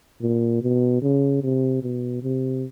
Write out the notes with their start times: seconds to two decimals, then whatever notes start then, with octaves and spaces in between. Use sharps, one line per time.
0.21 A#2
0.62 B2
1.02 C#3
1.42 C3
1.83 B2
2.22 C3